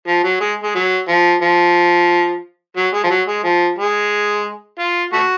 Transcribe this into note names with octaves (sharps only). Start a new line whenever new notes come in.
F3
F#3
G#3
G#3
F#3
F3
F3
F#3
G#3
F3
F#3
G#3
F3
G#3
F4
A3 F#4